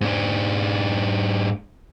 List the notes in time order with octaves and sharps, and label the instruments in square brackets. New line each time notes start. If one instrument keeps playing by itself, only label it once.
[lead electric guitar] G#2 D4